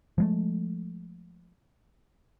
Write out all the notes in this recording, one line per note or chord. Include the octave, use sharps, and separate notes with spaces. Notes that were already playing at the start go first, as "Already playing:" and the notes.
F3 G#3 A3